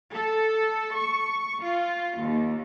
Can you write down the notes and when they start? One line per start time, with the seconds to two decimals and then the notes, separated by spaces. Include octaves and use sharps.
0.13 A4
0.98 C#6
1.65 F4
2.21 D#2